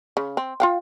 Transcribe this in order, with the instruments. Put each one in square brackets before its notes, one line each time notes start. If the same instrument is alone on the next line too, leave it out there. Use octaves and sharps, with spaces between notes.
[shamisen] C#3
C4
F4 F5 G5